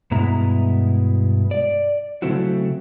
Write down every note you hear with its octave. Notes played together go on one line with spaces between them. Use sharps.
G2 B2 G#3 B3 E4 A#5
D5
C#3 F#3 A3 C4 E4 F#4